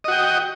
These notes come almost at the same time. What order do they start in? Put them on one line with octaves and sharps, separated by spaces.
D#5 F#4 G5